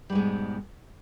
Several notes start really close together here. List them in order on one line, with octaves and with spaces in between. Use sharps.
G3 G#2 G#3 B2